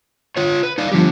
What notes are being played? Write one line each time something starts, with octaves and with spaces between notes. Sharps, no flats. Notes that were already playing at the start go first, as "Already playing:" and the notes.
F4 C#5
B4
D#4 D5 F5
D3 F3 G3 G4